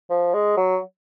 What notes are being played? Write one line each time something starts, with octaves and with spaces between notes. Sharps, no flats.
F3
G#3
F#3